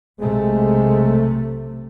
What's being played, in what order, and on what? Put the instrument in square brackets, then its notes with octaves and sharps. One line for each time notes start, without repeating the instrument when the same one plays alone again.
[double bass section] B1 C3 A3 [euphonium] G#3